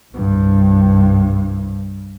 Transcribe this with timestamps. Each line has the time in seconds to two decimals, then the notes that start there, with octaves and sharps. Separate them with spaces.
0.13 C2 G2